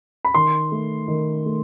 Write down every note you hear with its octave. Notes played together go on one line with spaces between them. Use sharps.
B5
D#3 C6
A3
D#3
A3